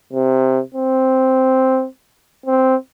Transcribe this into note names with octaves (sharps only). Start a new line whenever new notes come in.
C3
C4
C4